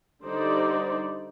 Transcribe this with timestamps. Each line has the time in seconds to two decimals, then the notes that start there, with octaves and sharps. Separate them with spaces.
0.23 D3 G3 D#4 C5 D5